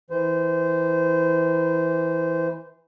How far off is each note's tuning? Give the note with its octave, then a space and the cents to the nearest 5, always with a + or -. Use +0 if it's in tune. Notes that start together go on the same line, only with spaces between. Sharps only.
E3 -10 C5 -25